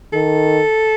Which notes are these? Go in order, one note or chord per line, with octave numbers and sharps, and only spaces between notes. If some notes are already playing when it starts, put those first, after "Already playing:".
D#3 A4